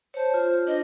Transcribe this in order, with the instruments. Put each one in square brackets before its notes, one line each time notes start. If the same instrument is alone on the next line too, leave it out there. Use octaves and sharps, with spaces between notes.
[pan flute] C5 [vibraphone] C#5 A5
[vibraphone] F4
[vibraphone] D4 [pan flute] D#5